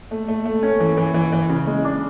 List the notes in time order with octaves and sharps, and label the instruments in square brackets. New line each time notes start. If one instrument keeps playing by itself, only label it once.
[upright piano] A3
A3
A3
C#4
E3
E3
E3
E3
C#3
G#3
D4